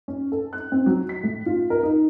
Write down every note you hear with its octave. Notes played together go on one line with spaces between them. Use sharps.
C#4
A4
F#6
C4
F#3
B6
A2
F4
A#4
D#4